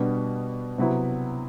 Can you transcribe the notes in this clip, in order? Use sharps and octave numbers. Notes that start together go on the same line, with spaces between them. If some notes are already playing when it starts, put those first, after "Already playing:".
Already playing: B2 G3 B3 D4
C3 F#3 B3 E4